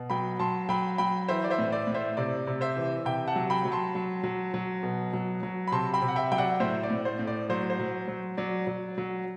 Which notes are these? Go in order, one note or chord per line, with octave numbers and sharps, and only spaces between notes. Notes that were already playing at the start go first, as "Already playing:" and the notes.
Already playing: B2
F#3 G5 B5
F#3 A5 C6
F#3 G5 B5
F#3 G5 B5
E3 C5 E5
D5
C5 E5
A2
D5
A2
C5 E5
C3 D5
C3
C5 E5
E3
C3 E5 G5
F#5 A5
F#3
G5 B5
F#3
A5 C6
F#3
F#3
F#3
B2
F#3
F#3
B5
C3 A5 C6
G5 B5
C3
F#5
E5 G5
F#3 G5
D5 F#5
A2 C5 E5
D5
A2
C5
A2
D5
F#3 C5
C5
F#3
F#3
F#3 D5
F#3
F#3